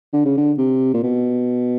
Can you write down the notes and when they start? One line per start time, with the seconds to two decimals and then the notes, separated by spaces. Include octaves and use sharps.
0.13 D3
0.25 C#3
0.37 D3
0.58 C3
0.94 A#2
1.03 B2